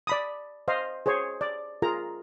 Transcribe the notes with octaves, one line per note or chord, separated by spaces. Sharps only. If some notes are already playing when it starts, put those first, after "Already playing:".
D5 B5 D#6
C5 D#5 F5
G#4 C5 C#5
D5
F4 G#4 A#4 A#5